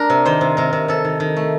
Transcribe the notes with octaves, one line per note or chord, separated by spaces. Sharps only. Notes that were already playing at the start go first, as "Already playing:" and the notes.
Already playing: D4 A#4
C3
D#3 C5
C3
C3 A#4
C3
C3 A4
D#3
D#3
A3